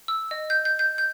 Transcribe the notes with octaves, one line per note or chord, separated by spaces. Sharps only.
E6
D#5
G6
G6
G6
G6